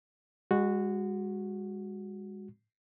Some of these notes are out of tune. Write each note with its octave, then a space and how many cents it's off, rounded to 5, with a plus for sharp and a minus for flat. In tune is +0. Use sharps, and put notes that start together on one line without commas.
G#3 -35 F#4 -5